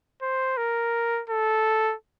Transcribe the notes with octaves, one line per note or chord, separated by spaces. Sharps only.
C5
A#4
A4